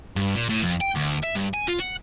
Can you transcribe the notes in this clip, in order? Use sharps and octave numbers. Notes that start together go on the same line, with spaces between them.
G2
A#2
A2
F2
G5
D2
E5
G2
G#5
F4
F#5